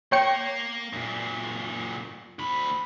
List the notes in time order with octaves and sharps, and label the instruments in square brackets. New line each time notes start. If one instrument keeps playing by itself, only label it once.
[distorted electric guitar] A#3 [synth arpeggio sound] C#5 G5 C#7
[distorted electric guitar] F#2 A#2
D2 B5